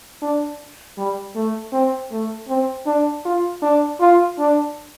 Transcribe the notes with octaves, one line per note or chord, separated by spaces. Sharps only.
D4
G3
A3
C4
A3
C4
D4
F4
D4
F4
D4